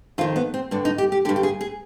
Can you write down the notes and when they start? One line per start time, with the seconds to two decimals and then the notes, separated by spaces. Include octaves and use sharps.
0.18 F2 D#3 F4
0.36 B3
0.54 C4
0.71 G2 D3 D4
0.85 D#4
0.98 G4
1.12 G4
1.25 D3 G4
1.29 G2
1.36 G4
1.43 G#4
1.61 G#4